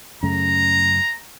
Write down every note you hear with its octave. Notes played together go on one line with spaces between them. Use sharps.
F#2 C#3 A3 A#5